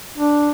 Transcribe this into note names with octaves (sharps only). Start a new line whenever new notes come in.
D4